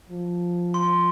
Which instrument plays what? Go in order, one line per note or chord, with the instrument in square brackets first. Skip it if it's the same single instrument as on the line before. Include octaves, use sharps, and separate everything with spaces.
[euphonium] F3
[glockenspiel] C6